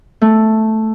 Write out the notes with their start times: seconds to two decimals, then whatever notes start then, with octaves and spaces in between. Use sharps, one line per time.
0.22 A3